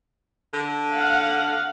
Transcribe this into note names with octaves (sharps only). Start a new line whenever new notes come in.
D3
F5 F#5